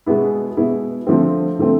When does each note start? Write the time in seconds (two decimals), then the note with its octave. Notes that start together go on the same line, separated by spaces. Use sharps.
0.06 B2 G#3 B3 E4
0.57 B2 G#3 B3 E4
1.07 D3 F3 A3 C4
1.58 D3 F3 A3 C4